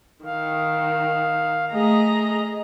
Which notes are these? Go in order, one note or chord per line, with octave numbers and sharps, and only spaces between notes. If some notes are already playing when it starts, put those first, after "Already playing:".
D#3 F5
A3 G#4 D#5 A#5